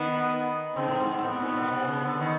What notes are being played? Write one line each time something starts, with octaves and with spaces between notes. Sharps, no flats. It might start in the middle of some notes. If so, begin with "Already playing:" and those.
Already playing: D#3 B3
C#3 C4
A2
G#2
G#2
A2 B3
A#2
B2
C3
C#3
D3
D#3